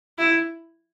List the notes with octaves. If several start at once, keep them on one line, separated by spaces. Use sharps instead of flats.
E4